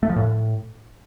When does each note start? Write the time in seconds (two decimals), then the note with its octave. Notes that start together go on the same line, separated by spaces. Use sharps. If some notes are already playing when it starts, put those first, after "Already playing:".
0.03 A3
0.09 F3
0.16 A2